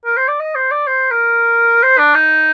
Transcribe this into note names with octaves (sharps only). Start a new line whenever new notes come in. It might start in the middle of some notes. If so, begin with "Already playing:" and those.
A#4
C5
D5
D#5
C5
D5
C5
A#4
C5
D4
D#4